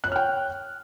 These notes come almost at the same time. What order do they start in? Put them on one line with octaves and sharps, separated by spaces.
F#6 C#5 F6 G5